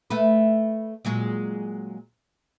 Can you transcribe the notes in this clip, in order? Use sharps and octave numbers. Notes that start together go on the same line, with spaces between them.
A3 B4
A#2 F#3 G#3